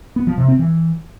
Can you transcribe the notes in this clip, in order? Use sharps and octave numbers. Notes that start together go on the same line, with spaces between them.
B3
F3
C3
C4
E3